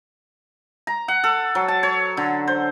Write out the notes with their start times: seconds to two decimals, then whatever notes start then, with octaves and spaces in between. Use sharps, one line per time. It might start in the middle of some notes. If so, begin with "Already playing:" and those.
0.87 A#5
1.08 F#5
1.24 A4
1.55 F#3
1.68 A5
1.83 C#5
2.17 D3
2.47 C5